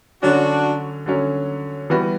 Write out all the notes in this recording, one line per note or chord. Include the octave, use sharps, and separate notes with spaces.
D3 F#3 C#4 D4 F#4
D3 F#3 C#4
E3 G3 B3 F#4